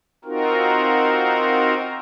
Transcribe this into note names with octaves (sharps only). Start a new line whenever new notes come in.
C4 D#4 F4 F#4 A#4